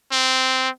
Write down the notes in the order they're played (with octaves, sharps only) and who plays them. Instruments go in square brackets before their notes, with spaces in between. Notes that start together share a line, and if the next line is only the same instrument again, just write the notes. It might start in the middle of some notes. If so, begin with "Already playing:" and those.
[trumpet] C4